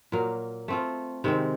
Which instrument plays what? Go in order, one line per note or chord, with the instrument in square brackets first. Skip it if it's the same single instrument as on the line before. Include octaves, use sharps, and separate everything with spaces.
[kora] A#2 F#3 A#3
A3 C4 F4
C3 D#3 G#3 C4